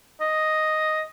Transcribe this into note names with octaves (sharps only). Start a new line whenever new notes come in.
D#5